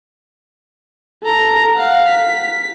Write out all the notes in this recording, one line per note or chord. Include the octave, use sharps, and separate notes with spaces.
A4 A#5
F5 F#5
B6